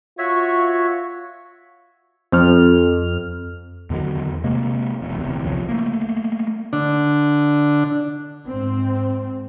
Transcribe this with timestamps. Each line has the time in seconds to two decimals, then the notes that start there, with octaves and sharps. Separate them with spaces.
0.18 F4 F#4 C#5 E5
2.32 F2 F6
3.90 E2 D3 D#3 F#3
4.44 C3 G#3 A#3
5.02 E1 E2
5.17 D1 E2 C3
5.45 C2 C#3 F3
5.69 A3 A#3
6.73 D3 D4
8.47 G#2 C4